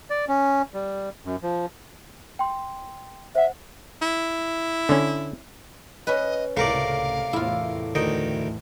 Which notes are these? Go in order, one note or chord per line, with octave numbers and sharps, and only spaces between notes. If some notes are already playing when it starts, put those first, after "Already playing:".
D5
C#4
G3
F#2
F3
G5 C6
C5 E5 F#5
E4
D3 C#4
C#4 B4 D#5
C#2 A2 C3 A3 A#4 D5 F5
E2 A2 E4 F4
D2 D#3 D#5 G5